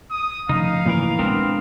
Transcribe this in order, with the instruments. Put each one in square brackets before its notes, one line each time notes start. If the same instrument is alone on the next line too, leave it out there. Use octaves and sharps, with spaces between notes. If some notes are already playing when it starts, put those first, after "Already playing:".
[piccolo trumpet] D#6
[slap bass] C#3 F3 A3 [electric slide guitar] D#4 [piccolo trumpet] F5
[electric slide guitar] A#2 E3 A#4
[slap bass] G#3 D4 [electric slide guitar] B3 C4 A#4